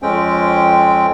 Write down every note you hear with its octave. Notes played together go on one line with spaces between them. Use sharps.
F2 G#3 C4 C#4 G5